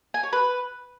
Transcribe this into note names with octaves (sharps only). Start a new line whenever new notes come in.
G#5
C#5
B4